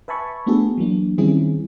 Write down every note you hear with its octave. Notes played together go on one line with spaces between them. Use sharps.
B4 E5 G#5 A5 B5 C#6
A3 B3 D4 F#4 G#4 A4
E3 F#3 A#3 D4
D#3 G3 C4 C#4 E4 G#4